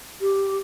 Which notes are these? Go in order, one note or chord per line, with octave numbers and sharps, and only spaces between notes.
G4